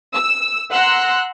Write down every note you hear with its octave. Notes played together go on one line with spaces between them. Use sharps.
E6
F#5 A#5 C6 E6 F#6